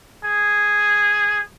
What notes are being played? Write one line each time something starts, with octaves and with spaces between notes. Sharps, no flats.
G#4